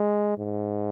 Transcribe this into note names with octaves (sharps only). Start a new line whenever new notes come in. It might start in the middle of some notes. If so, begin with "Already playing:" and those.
Already playing: G#3
G#2